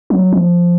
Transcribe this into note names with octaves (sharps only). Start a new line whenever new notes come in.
F#3
F3